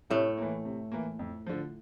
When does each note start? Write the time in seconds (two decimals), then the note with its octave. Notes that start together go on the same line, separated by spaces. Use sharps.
0.10 A2 C3 A3
0.37 E3 A#3
0.65 C3
0.92 E3 A#3
1.19 F2
1.46 D3 F3